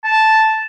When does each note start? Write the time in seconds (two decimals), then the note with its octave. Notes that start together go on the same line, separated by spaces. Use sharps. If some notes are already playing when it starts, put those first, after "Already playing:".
0.04 A5